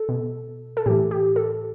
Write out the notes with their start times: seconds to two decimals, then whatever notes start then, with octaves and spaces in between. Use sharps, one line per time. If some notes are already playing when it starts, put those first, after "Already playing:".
Already playing: A4
0.09 B2
0.77 A4
0.86 A2 E3 G4
1.11 G4
1.36 A4